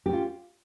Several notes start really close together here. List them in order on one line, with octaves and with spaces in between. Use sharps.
G4 C#4 F4